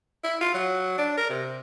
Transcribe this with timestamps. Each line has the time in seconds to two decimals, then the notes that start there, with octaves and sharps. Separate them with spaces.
0.24 E4
0.41 F4
0.55 F#3
0.98 D4
1.18 A#4
1.30 C3